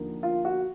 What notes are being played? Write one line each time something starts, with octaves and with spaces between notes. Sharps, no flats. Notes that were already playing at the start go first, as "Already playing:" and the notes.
Already playing: D#2 D3 F3 A#3
F4
F#4